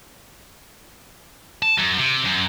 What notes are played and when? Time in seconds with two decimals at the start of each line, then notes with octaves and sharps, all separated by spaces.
1.63 A5
1.78 F#2
1.98 C3
2.25 F#2